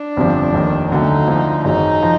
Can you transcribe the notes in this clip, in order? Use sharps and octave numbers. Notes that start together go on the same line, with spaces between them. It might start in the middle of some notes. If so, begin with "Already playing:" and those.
Already playing: D4
G1 F2 C3 F3
F1 D#2 D#3
D2 D3 F#3 D#4
D2 D3 F3
G#1 F#2 C#3 F#3 D#4
F3